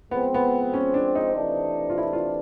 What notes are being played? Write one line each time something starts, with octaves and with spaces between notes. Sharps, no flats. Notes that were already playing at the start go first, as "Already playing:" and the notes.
F3 G#3 B3 C4
B3
C#4
D4
D#4
C3 E3 A3 D4
F4
E4
F4